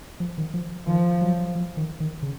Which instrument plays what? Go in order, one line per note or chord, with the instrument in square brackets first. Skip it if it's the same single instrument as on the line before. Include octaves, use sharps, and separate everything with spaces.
[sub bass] F3
D#3
F3
[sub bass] D#3 [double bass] F3
[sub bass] F#3
F3
D#3
D#3
C#3